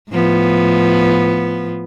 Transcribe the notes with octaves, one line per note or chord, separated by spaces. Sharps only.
A2 F3 B3